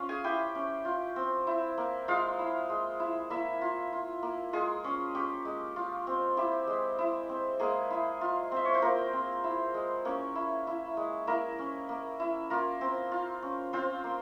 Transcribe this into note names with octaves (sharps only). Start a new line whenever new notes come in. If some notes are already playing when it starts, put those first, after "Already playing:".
Already playing: C#4 F4 F5
G#4 G#5
E4 G4 G5
C#4
F4
C4
E4
A#3
G#3 F4 F5
E4
G#3
E4
A#3 E4 E5
F4
F4
A#3
G#3 F4 G#4
C#4
C#4 G4
G#3
F4
C4
E4 G4
G#3
E4
C4
G#3 A#3 G#4
E4
F4
C4 E5
C#5
C5
A#3 F4 A#4
C4
E4
G#3
A#3 C#4 C#5
E4
E4
G#3
A#3 E4 A#4
C#4
A#3
E4
A#3 F4 A#4
C4
F4
C#4
C4 F4 C5
A#3